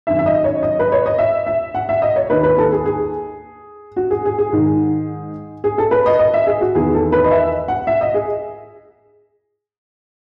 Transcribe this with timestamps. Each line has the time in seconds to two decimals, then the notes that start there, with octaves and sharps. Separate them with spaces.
0.07 F#2 D#3 E5
0.19 E5
0.26 D#5
0.44 C#5
0.63 D#5
0.79 B4
0.92 C#5
1.06 D#5
1.18 E5
1.47 E5
1.75 F#5
1.89 E5
2.02 D#5
2.16 C#5
2.30 D#2 D#3 B4
2.44 B4
2.58 A4
2.72 G#4
2.86 G#4
3.96 F#4
4.11 G#4
4.25 G#4
4.39 G#4
4.52 G#2 D#3
5.64 G#4
5.78 A4
5.91 B4
6.06 D#5
6.19 D#5
6.34 E5
6.47 G#4
6.61 F#4
6.75 E2 D#3 G#4
6.94 A4
7.12 B4
7.24 D#5
7.31 E5
7.68 F#5
7.87 E5
8.01 D#5
8.14 G#4